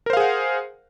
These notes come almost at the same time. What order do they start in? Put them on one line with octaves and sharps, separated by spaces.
A#4 C5 F5 G#4 F#5